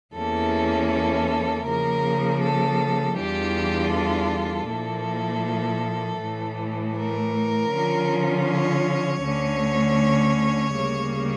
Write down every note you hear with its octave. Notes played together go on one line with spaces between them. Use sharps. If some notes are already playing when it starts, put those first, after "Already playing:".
E2 E3 A#3 C#4 E4 A4
A4
C#3 F3 A#3 A#4
A4
E2 E3 G3 D4 F4 G4
A4
A#2 F3 A#3 E4
A2 E3 A3
A#4
D3 F3 C#4 F4
C#5
D2 D3 A3 C#4
D2 C#3 G3 A#3